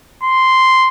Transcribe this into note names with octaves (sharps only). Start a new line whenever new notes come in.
C6